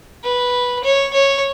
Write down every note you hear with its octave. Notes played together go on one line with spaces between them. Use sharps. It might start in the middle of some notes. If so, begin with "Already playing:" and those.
B4
C#5
C#5